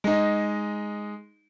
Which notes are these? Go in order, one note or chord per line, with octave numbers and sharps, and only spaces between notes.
G#3 D#4